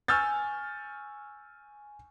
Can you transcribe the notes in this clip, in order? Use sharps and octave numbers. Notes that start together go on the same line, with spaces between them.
G#5 C#6 E6 F6 G6 A6